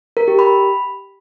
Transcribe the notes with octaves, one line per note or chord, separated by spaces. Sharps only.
A#4
G4
B5